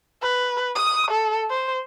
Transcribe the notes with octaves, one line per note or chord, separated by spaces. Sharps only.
B4
D#6
A4
C5